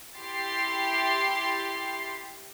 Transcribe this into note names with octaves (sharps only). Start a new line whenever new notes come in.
E4 G4 C6 A6 C7